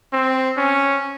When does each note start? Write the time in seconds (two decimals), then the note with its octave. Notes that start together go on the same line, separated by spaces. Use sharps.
0.13 C4
0.57 C#4